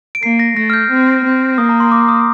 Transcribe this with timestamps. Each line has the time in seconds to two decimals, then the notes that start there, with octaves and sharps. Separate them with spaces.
0.15 D7
0.22 A#3 C7
0.39 A#6
0.57 A3 A#6
0.70 F6
0.73 G6
0.91 C4
1.25 C4
1.57 A#3 D#6
1.69 A#5
1.80 C6
1.92 D6
2.09 D#6